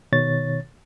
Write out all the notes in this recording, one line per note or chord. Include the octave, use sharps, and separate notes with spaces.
B2 D#3 C#5 A6